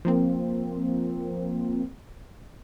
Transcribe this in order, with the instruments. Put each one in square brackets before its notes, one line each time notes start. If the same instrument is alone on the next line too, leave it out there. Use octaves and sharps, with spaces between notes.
[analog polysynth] F3 A#3 C4